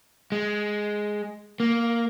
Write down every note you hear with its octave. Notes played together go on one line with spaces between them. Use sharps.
G#3
A#3